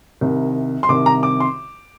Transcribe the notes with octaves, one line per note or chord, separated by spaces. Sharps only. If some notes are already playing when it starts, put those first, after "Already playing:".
C2 C3 D#3
C6
C2 C3 D#3 D6
A#5
D6
C6